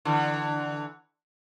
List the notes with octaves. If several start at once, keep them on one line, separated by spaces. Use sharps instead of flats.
D3 E3